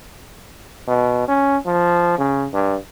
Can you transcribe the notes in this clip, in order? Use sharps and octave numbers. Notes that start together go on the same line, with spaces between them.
B2
C#4
F3
C#3
G2